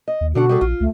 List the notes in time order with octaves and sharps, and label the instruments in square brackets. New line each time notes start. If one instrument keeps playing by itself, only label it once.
[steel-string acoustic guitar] D#5
[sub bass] D#2
[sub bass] B2 [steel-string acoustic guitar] D3 D4 F#5 [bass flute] F#4
[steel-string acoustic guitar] G3 G#4 A4
[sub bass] A#1 [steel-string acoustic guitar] F4
[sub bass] C#2 [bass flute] A3